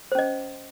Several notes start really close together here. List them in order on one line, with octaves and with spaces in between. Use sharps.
C5 C#4 D#5